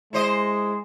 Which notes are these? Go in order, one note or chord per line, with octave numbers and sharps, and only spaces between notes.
G#3 E4 C5 D#5